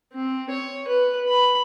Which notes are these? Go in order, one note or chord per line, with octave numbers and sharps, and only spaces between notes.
C4
C#5
B4
B5